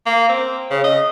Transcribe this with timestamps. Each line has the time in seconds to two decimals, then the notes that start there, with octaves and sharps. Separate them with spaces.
0.06 A#3
0.29 C4
0.71 C#3
0.84 D#5